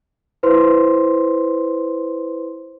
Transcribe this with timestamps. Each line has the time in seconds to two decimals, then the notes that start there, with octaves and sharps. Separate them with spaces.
0.43 E4 B4 C5 C6